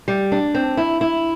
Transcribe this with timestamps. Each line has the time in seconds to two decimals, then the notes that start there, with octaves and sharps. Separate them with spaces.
0.08 G3
0.32 D4
0.54 C4
0.77 E4
1.01 E4